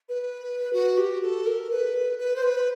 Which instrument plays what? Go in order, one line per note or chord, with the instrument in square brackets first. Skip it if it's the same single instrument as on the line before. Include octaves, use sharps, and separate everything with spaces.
[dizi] B4
F#4
G4
A4
A#4
B4
B4
C5
B4